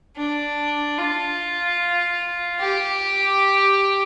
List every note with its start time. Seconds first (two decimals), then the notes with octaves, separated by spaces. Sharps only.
0.17 D4
0.98 F4
2.60 G4